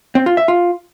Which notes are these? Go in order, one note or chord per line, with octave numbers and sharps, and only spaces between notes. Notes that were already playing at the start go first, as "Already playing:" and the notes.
C4
F4
E5
F4